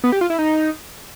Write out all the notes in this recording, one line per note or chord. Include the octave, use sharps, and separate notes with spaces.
B3
G4
F4
E4
D#4